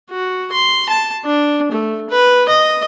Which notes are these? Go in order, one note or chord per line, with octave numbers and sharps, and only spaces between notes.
F#4
C6
A5
D4
A3
B4
D#5